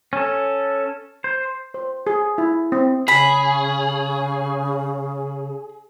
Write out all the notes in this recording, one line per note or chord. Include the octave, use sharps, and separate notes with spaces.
C#4 A4
C5
C5
G#4
E4
C4
C#3 G#4 B5